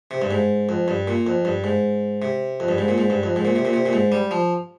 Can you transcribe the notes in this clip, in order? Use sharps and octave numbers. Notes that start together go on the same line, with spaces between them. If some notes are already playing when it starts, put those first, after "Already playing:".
C3
G2
G#2
F2
G2
A#2
F2
G2
G#2
C3
F2
G2
G#2
A#2
G#2
G2
F2
G#2
A#2
C3
A#2
C3
A#2
G#2
G3
F3